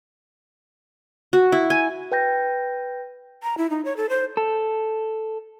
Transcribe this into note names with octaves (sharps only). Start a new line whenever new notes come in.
F#4
E4
G#5
B4 G5 G6 A#6
A#5
E4
D#4
C#5
A4
C5
A4